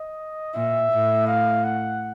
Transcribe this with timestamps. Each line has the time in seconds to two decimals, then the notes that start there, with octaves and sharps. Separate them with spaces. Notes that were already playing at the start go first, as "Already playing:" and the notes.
Already playing: D#5
0.54 A#2 E5
0.91 A2
1.27 F5
1.64 F#5